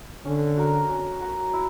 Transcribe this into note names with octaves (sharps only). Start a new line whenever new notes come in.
D3 C#4
F#4 A#4
C#4
F#4 A#4
E4